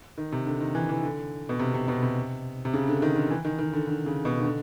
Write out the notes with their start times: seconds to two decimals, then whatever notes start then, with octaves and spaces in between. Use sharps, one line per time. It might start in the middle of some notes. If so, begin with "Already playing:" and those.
0.18 D#3
0.32 C3
0.46 D3
0.61 D#3
0.75 E3
0.89 E3
1.03 D3
1.49 B2
1.59 C3
1.74 C3
1.88 B2
2.03 C3
2.65 C3
2.74 C#3
2.88 D3
3.02 D#3
3.16 D3
3.31 E3
3.45 D#3
3.59 D#3
3.73 D3
3.87 D3
4.06 C#3
4.25 B2
4.39 D#3
4.44 D3